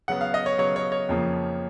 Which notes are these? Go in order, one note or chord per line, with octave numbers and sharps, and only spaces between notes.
C#3 F#3 B3 F#5
F5
D#5
C#5
C#3 F#3 B3 C#5
C#5
C#5
F2 C#3 F3 A#3